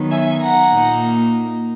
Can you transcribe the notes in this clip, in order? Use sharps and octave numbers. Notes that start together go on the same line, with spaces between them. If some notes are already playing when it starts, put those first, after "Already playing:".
Already playing: D#3 F#3 B3 D#4
E5 G#5
F#5 A#5
A#2 A#3 D#4